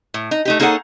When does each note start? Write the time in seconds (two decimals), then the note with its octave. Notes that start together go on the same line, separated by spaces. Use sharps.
0.14 A2
0.31 D#4
0.45 A3 D#4 G4
0.60 A#3 D#4 G#4 A4 C#5 F#5